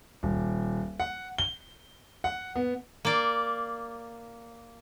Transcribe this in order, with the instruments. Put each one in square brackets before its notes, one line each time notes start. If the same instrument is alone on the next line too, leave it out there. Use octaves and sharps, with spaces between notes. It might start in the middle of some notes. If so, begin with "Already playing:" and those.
[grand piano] D#1
F#5
G7
F#5
B3
[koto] A#3 D5